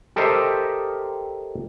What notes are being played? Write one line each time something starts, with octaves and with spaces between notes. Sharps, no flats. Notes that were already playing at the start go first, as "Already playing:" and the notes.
G4 A4 A#4 C5 D#5 E5